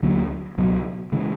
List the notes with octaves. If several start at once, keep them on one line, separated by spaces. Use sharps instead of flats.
D2 D3 F#3 A#3
C#2 B2 F#3
C#3 E3 G#3